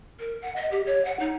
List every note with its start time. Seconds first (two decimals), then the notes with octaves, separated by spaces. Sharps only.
0.20 A#4
0.42 F#5
0.56 D#5
0.71 G4
0.86 C#5
1.05 F#5
1.20 D#4